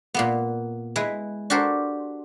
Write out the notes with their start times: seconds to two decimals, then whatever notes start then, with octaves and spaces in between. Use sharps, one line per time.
0.14 A#2 A#3 B3
0.96 G#3 E4 B4
1.50 D4 F#4 G4 A4 A#4 C5